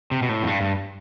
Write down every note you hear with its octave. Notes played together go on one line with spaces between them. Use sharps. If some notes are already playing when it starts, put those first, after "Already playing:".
C3
B2
A2
F2
G2
G2